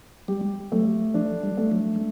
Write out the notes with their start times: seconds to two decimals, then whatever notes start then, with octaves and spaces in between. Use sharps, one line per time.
0.28 G3 G4
0.72 F#3 A3
1.14 F3 D4
1.43 G3
1.57 A3
1.72 F#3
1.96 G#3